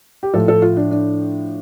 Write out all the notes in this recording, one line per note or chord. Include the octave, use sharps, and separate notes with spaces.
G4
A2 F3 A4
A4
F4
D4
D4